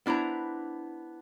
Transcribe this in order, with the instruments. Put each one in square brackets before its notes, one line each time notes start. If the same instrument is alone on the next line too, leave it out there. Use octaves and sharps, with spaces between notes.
[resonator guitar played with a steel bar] B3 D4 E4 C5 A#5